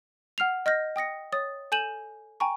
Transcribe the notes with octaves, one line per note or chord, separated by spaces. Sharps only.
F#5 F6 C7 F7
D#5 F6 G6 A#6
G5 D#6 A#6 C#7
C#5 D#6 A6
A4 G#5 G6 D#7 E7 F#7
G5 G#5 A#5 C#6